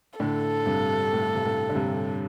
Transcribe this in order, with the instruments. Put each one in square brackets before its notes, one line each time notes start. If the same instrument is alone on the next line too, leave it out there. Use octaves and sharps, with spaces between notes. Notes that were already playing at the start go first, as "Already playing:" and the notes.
[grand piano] A2 D3 [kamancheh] A4
[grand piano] G2 C3
A2
C3
A2
D3
G2 C3